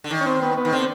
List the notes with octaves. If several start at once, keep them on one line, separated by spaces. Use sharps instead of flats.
D3
D#3
C#4
C4
B3
B3
D#3
D3 C4